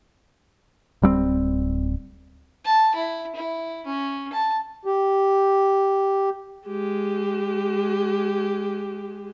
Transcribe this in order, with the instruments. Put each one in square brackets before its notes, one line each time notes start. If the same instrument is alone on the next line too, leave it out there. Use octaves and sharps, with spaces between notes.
[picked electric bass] D1 G3 A3 C4
[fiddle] A5
E4
E4
C#4
A5
[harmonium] G4
[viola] G#3 G4